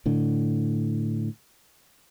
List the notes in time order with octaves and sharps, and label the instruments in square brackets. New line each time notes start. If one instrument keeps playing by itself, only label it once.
[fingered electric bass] A2 D3